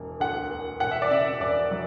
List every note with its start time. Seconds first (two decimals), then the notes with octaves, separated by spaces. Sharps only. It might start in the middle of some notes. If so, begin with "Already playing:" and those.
Already playing: E1 A#3
0.20 D2 F#5
0.51 A#3
0.80 E1 F#5
0.91 E5
1.02 D5
1.11 C#3 E5
1.40 E1 D5
1.71 F#3